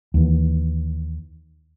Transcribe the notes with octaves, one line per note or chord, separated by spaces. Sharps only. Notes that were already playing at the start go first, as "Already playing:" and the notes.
D#2 E3